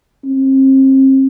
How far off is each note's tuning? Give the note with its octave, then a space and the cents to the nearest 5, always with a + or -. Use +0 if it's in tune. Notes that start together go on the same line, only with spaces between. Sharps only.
C4 +35